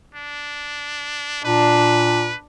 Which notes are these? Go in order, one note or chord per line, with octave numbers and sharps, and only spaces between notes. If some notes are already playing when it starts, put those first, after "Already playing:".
D4
A#2 D4 B4